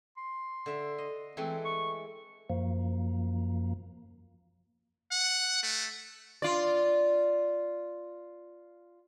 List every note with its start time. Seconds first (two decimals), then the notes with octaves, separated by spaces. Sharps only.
0.17 C6
0.66 D3 E5
0.98 D#5
1.37 E3 G#3 A3 C4
1.65 C#6
2.50 F#2 F3 A#3
5.12 F#5
5.63 A3
6.42 F4 D5